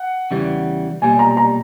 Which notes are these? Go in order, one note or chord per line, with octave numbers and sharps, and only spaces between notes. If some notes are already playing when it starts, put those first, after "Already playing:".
Already playing: F#5
E2 C#3 E3 G3
B1 A#2 G3 G#5
A#5
A#5